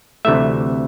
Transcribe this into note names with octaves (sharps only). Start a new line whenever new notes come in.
D2 C3 E3 A3 E5